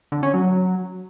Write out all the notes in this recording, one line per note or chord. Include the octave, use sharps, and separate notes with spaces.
D3
C#4
F#3